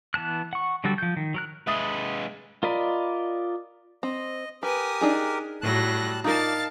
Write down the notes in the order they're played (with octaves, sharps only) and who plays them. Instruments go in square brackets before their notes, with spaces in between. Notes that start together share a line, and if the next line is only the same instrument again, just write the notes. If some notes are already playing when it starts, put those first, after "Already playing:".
[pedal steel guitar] E3 B3 A5 F#6
F#5 C#6
D3 F#3 G3 F#4 A4
F3 G6
D#3
F#3 A#4 F#6
[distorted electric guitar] G#3 B4 [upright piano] E5 D#6 A6
[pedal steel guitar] F4 A#4 D5 D#5 B5
[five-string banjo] C4 [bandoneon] D#5
[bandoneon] G4 A#4 [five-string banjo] B4 [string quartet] G#5 D#6
[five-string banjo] D4 D#4 G#4
[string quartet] A2 F#3 A#6 [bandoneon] G3 A5 F#6
[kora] D#4 A#4 [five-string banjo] F4 [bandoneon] D5 [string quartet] F5 A5 A6